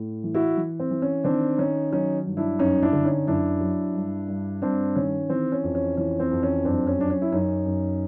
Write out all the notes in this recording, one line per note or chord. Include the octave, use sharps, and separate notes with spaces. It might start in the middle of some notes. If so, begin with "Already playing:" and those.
Already playing: A2
E3
E4 F#4
E3
C4
E3
C#4
D#3 C4 D4
D#3 C#4 D#4
F#3 C#4 D#4
G2
D4 E4
F#2 C#4 D#4
D4 E4
D3
C#4 D#4
F#2 D4 E4
F#3
G2
G2
G2 C4 D4
D#3 C#4
E3 C4
C#4
F2
C#4
E3 C#4
C4
F2
C#4
F#2 C4 D4
C#4
F#3 D4
C#4
E4
F#2 C#4 D#4
F#2